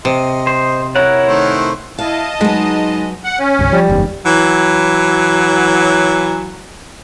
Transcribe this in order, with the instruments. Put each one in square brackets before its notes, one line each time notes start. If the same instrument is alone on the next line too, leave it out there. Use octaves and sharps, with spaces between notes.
[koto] C3 [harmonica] D#5 C6
[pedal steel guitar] C5
[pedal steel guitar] E4 A#4 F#5 [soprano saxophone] C#5
[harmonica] D#3 A3 C5
[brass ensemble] E4 [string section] D#5 A5 [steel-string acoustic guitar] F5
[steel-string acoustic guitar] F#3 B4 [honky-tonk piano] G#3 [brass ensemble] D#4
[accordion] F#5
C#4
[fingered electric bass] C2 G2 D3
[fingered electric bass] F3 [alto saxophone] G3
[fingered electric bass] F#1 E2 G#2
[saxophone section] E3 F#3